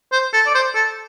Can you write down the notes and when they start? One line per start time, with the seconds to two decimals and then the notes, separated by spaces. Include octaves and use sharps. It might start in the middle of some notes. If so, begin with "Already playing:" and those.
0.12 C5
0.33 A4
0.47 D5
0.55 C5
0.75 A4